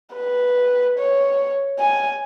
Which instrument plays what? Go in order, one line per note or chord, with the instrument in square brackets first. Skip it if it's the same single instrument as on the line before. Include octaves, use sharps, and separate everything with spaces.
[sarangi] B4
C#5
G#5